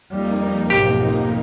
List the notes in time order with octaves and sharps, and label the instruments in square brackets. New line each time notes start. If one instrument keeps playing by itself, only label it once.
[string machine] F2 A#3 D#4 [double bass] G3
[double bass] B1 G#2 [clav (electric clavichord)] G4